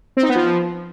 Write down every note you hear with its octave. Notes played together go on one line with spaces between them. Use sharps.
C4
D#4
B3
F3